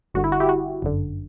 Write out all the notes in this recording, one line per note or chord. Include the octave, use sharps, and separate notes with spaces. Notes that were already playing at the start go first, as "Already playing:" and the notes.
G1 G2 D3 F#4
E4
F#4
E4 G4
F#4
G1 F#2 D3